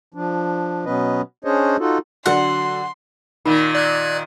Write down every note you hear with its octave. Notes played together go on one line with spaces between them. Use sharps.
F3 D4
B2 F#3 B3 C#4 B4 D#5
C#4 D4 G#4 C5 C#5 D#5
D#4 F4 F#4 A4
D3 F#3 D4 F#5 C6
A#2 D#3 D#4
D5 F#6 G#6